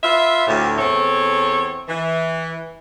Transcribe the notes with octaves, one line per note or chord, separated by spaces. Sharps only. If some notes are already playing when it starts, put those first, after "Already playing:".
F4 B4 E5
D2 A2
E2 C4 A4 C#5
E3